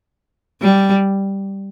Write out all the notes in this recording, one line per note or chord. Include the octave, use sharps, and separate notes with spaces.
G3